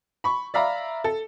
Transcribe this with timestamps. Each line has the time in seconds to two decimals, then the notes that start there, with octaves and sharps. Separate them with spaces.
0.24 B5 C#6
0.54 D5 E5 F5 A#5 B5
1.04 A4